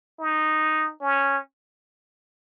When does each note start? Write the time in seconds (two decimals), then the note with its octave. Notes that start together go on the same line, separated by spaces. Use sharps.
0.19 D#4
1.01 C#4